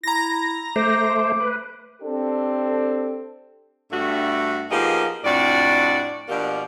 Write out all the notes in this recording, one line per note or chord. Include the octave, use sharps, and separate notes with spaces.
E4 A#5 A#6
A3 C5 D6
B4
C4 D4 G4 A4
G2 A3 F#4
F3 A#3 B3 D#4 G4 G#4
F2 A2 D4 F#4 D5
B2 F3 A#3 D4 G4